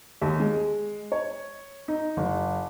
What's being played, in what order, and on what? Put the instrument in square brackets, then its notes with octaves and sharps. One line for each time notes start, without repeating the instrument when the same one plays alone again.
[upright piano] D#2
G#3
C#5
D#4
F#1